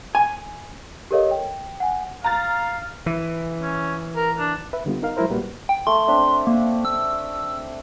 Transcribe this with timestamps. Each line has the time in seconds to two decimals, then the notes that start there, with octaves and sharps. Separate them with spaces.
0.15 G#5
1.11 G4 A4 A#4 C#5 D#5 F5
1.31 G5
1.80 F#5 G#5
2.24 F5 A#5 A6
3.06 E3
3.62 C#4
4.16 A#4
4.39 D4
4.73 B4 E5
4.86 D3 G3 B3 F4
5.02 D#4 A#4 F5
5.17 F#3 G#3 E4 A#4 C5
5.30 A#2 G3 A#3 F#4 B4
5.69 G5
5.87 A3 C6
6.08 C4 D4 E5
6.47 A#3
6.85 E6